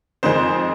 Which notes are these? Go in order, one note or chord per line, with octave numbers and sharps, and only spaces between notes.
F2 D#3 G#3 C5